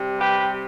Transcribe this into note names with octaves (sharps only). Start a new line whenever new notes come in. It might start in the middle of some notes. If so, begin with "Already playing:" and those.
Already playing: C3 G3
G4 B4